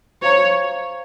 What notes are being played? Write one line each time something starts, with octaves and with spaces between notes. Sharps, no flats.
C5 C#5 F5 A#5 C#6